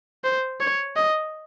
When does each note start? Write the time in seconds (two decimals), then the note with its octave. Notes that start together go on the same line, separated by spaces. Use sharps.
0.24 C5
0.60 C#5
0.96 D#5